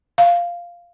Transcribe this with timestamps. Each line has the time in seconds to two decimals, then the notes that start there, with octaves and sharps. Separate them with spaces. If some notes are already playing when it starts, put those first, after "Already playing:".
0.18 F5